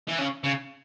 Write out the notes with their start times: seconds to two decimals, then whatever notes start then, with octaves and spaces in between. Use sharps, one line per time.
0.08 E3
0.18 C#3
0.44 C#3